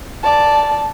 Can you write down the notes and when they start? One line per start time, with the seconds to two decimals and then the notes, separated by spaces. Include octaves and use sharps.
0.23 D5 A5